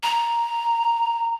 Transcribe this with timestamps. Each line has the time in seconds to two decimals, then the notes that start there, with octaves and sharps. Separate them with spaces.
0.03 A#5